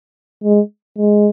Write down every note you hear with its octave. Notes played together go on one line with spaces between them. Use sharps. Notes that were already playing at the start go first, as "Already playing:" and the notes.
G#3
G#3